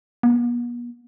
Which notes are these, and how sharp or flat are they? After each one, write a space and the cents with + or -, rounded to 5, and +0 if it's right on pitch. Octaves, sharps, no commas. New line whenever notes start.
B3 -45